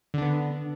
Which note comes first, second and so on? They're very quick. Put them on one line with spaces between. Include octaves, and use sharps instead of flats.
D3 D4 B3